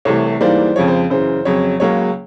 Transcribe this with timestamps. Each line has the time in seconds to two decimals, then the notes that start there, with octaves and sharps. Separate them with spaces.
0.05 C2 C3 E3 A3 C#5
0.41 G#2 E3 G3 A#3 C5 D5
0.76 F2 C#3 F3 G#3 C#5
0.88 C5
1.10 F#2 C#3 E3 C5
1.45 F2 C#3 F#3 C#5
1.80 C#2 C#3 F#3 A#3 C#5